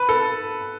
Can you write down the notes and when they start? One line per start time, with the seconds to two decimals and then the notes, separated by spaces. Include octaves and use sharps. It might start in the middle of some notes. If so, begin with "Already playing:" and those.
Already playing: B4
0.09 A4